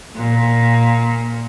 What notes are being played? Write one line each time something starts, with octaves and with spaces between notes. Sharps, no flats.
A#2